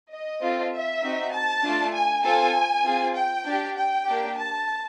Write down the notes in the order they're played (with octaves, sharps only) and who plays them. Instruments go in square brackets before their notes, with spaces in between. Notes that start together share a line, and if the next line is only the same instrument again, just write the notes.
[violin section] D#5
C4 F4 A4
E5
C4 D#4 F#4
A5
A3 D4 F4
G#5
C4 F4 A4 G#5
C4 F4 G#4
G5
D4 G4
G5
A#3 D4 G4
A5